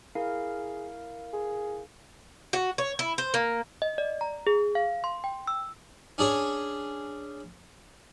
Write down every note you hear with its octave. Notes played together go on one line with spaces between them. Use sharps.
E4 G#4 A#4 F5
G#4
F#4
C#5
E4
C5
A#3
D#5
D5
A#5
G#4
F5
C6
G5
E6
C#4 D4 G#4 C#5